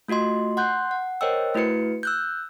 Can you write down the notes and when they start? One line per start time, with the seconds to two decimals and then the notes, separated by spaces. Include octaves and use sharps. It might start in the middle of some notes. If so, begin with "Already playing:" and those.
0.08 A3 F4 F#4 D#5 C6
0.57 F#5 C6 F#6 G6
0.91 F#5
1.21 A#4 C5 C#5 D#5 G5 E6
1.54 A3 E4 F#4 B4 C#7
2.03 E6 F#6 G6